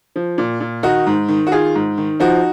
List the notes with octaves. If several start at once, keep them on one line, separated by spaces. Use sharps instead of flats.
F3
A#2
A#2
D#3 D#4 F#4
G#2
D#3
F#4
D#3 F4 G#4
G#2
D#3
F3 D#4 F#4